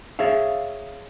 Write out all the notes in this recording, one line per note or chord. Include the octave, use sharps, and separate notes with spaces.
G#4 C#5 E5 F5